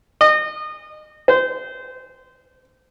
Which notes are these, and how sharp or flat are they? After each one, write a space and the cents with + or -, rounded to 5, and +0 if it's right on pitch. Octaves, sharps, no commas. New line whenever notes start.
D#5 -30
C5 -25